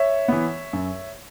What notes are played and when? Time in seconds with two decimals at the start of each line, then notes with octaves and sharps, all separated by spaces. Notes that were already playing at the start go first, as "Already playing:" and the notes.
Already playing: C#5 E5
0.28 E3 B3
0.73 F#2